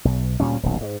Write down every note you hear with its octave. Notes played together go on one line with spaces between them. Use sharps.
B1
D2 A#2 G3 C#4
D#1 B1
G#2